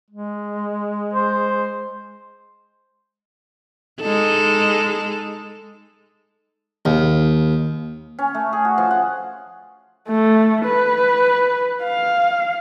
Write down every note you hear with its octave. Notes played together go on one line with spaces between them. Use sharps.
G#3
C5
G#3 D#4 A4
D#2
C#4
A3
G#4
F#4
F3
F#5
A3
B4
F5